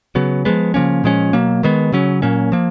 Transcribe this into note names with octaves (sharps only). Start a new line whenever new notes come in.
C#3 F#3 B3
F3 G#3 B3
C#3 F3 A#3 C#4
A#2 F3 G#3 C#4
B2 F#3 A#3
D#3 G#3 B3
C#3 F#3 C#4
A#2 F#3 A#3 C#4
F3 A#3